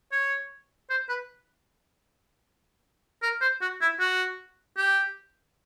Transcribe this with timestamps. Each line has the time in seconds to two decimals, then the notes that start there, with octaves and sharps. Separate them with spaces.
0.12 C#5
0.90 C5
1.09 B4
3.23 A#4
3.41 C5
3.61 F#4
3.81 E4
4.00 F#4
4.77 G4